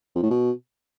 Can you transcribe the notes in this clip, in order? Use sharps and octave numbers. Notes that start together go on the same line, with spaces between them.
F2
A2
B2